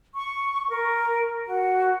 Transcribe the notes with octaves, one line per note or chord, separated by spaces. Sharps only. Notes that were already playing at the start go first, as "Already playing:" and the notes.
C#6
A#4
F#4